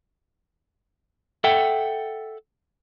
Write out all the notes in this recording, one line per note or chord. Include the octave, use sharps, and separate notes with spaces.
A4 E5 F#5 G5